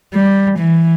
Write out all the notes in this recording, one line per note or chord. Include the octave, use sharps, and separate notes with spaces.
G3
E3